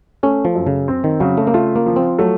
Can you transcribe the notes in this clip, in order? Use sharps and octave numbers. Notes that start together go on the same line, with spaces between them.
A3 C#4
F3
F#2
C#3
C4
D#3
C#3 F#3
A3
A#3
A3 F4
A#3
F3
C4
F#3 A3